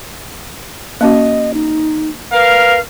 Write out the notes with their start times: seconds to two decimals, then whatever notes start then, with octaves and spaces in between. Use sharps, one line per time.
1.01 A#3 C#4 F#4 D#5
1.54 D#4
2.33 A#4 B4 F5